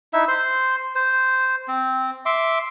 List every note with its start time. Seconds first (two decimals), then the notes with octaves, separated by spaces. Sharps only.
0.13 D#4 E4 E5
0.28 C5 C6
0.95 C5
1.68 C4
2.25 E5 C6 D6